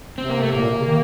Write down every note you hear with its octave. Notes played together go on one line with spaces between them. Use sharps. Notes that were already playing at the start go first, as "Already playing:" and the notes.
C3 C4
A#3
A3
A2 A#3
A#2
C3
C#3
D#3